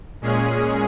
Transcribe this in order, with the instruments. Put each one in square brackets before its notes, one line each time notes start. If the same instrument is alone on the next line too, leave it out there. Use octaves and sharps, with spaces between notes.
[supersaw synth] A#2 G#3 C#4 G#4